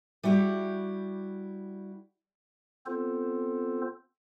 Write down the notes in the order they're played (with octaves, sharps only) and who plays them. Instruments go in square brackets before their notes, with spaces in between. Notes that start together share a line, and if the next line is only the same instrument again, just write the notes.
[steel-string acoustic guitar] G3 E4 F#4 G4
[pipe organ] B3 C4 F4 A4 C5